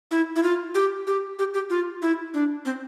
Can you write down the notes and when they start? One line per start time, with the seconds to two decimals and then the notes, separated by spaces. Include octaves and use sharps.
0.11 E4
0.36 E4
0.43 F4
0.75 G4
1.07 G4
1.39 G4
1.54 G4
1.70 F4
2.02 E4
2.34 D4
2.65 C4